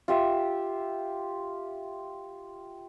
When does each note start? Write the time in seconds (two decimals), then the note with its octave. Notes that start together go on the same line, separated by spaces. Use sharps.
0.08 F4 G4 E5